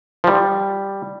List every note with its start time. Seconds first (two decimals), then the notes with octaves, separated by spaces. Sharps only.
0.24 F3
0.27 G3